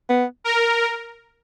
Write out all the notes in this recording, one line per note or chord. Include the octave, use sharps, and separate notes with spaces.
B3
A#4